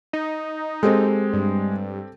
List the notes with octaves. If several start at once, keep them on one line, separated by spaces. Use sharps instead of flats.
D#4
G#3 C4 G4 A4
G2